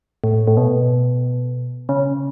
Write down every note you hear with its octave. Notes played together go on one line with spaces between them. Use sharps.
A2
A2
B2
C#3